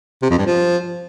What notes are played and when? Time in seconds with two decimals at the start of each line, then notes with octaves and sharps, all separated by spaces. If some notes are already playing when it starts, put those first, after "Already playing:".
0.22 C3
0.30 F2
0.38 G2
0.46 F3